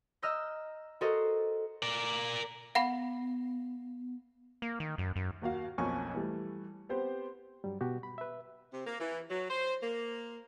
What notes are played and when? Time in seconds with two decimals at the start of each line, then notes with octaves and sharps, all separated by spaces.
0.22 D#5 A#5 E6 F6 G6 A#6
1.01 F#4 A4 A#4 C5 D#5
1.83 A#4 D5
2.75 B3 F5 F#5 B5
4.62 A#3
4.80 D#3
4.98 F#2
5.16 F#2
5.42 D#2 A#3 F#4 F5
5.78 B1 F2 A#3 C#4 G#5 C#6
6.14 E3 G3 A3
6.89 B3 C4 G4 C5
7.64 G2 F#3 G3
7.81 B2 F#4 G4
8.03 B5
8.18 B4 E5
8.72 C3
8.87 A#3
8.99 E3
9.30 F#3
9.50 C5
9.82 A#3